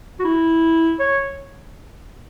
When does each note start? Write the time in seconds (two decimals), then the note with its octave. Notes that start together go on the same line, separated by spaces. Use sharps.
0.20 F#4
0.25 E4
1.00 C#5